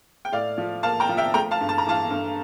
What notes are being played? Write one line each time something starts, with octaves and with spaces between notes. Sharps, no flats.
G5
A2 D5 F5
F3
A#3 F5 A5
G5 A#5
F3
E5 G5
A3 G5 A#5
F5 A5
G2
A5
A#5
E3 F5 A5
G2